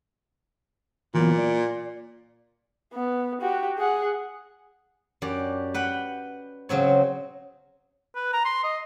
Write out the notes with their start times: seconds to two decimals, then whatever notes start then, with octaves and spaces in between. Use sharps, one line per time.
1.15 A#2 E3 F#3 B3
1.38 D5
2.93 B3
3.41 F#4 G4
3.78 G#4 F#5
5.22 F#2 G4 D5
5.74 B4 F#5 G5
6.69 C#3 F#3 C4 C#5
8.16 B4
8.33 A#5
8.45 C6
8.64 D#5